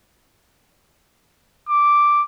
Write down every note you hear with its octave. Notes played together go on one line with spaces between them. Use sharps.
D6